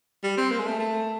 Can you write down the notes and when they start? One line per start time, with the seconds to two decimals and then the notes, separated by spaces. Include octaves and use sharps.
0.23 G3
0.37 C4
0.51 A#3
0.58 G#3
0.65 A3
0.79 A3